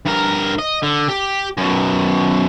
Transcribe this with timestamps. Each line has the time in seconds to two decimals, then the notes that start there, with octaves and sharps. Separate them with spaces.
0.05 G2 A#4
0.58 D#5
0.82 D3
1.08 G4
1.57 F#2 B2